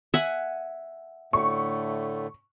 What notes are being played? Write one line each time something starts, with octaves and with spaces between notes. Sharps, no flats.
E5 F#5 G#5
A2 D3 A3 C#6